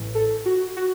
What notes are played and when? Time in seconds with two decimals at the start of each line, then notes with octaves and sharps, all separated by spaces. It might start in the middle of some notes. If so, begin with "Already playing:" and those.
Already playing: A1 A2 E3
0.15 A4
0.46 F#4
0.77 F#4